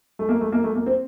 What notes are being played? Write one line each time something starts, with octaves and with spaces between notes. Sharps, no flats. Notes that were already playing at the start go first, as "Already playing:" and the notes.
A3
A#3
A3
A#3
A3
A#3
C4